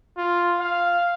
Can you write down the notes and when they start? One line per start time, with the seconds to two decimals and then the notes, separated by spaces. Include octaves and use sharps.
0.17 F4
0.60 F5